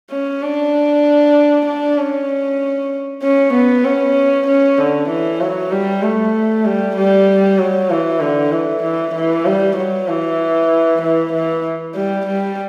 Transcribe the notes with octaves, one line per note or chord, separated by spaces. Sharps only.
C#4
D4
D4
C#4
C#4
B3
C#4
C#4
D3
E3
F#3
G3
A3
G3
G3
F#3
E3
D3
E3
E3
E3
G3
F#3
E3
E3
E3
G3
G3